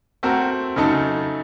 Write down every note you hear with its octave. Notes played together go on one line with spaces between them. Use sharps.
A3 C4 F#4 A#4
C#3 F#3 A3 D#4 A4